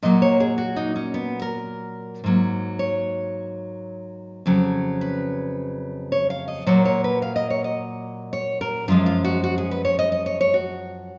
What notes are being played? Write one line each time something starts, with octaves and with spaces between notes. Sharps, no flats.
A#2 F#3 A#3 D#5
C#5
G#4
F#4
D#4
C#4
B3
A#4
G#2 F#3 A#3
C#5
F2 C#3 F#3
B4
C#5
F5
D#5
A#2 F#3 A#3 C#5
C#5
B4
F5
D#5
C#5
D#5
C#5
A#4
F#2 F3 G#3 F4
F4
F#4
F#4
G#4
B4
C#5
D#5
D#5
C#5
C#5
F#4